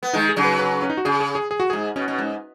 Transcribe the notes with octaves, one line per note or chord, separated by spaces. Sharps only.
B3
D#3 G#3 D#4
G#4
C#3 F#3
B4
B4
C#4
D#4
F#4
C#3 G#4
G#4
G#4
G#4
F#4
G#2 G#4
B2 C#4
B2
G#2